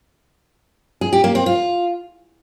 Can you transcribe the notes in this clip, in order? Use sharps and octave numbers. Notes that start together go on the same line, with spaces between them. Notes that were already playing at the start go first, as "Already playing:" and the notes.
G#4
G4
A#3
C4
F4